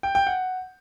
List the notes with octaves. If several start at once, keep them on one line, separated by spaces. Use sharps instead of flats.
G5
G5
F#5